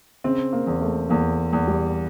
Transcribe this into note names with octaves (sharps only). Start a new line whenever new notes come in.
C#3 C4
A#3
E2
A3
E2 A#3
E2
G3